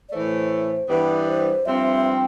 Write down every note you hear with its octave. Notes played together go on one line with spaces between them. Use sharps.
D5
A2 E3 A3 C5
G2 E3 G3 B3 B4
C5
G2 F3 C4 E5
G5